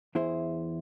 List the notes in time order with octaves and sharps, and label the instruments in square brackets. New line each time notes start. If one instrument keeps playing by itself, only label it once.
[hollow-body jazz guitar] E2 E4 G#4 C5